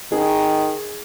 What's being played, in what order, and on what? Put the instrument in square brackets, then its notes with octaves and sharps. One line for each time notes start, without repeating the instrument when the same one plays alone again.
[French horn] D#3 [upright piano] G#4